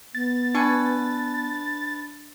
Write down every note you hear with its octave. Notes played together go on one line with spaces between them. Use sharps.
B3 A6
D4 B4 G#5 C#6